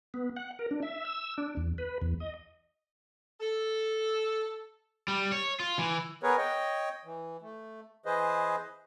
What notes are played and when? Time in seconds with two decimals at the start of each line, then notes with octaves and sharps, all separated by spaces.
0.14 B3
0.36 F#5
0.59 A#4
0.71 D4
0.83 E5
1.05 E6
1.38 D4
1.57 E2
1.78 B4
2.01 E2
2.20 D#5
3.39 A4
5.08 G3
5.32 C#5
5.60 F4
5.79 E3
6.23 B3 G#4 A#4 B4 C#5
6.38 C#5 D#5 G5
7.05 E3
7.42 A3
8.06 E3 G#4 B4 C5 D#5